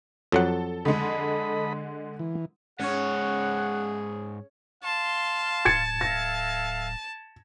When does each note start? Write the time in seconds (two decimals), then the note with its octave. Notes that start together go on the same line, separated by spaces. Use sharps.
0.32 F2 F#3 A4 F#5
0.85 D3 G#3 A4 D#5 B5
2.19 E3
2.80 G#2 C#4 G#4 C#5 F#5
4.84 F5 A5 C6
5.65 D1 G#6 A6 C#7
6.01 A4 E5 F5 A#6